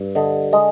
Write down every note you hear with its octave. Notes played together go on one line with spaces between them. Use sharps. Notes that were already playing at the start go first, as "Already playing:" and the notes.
Already playing: G2
D3 D#5
G#3 D#5